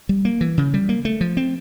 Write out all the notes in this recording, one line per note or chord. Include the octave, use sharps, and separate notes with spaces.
G3
A#3
E3
C#3
G3
A#3
A3
F3
C4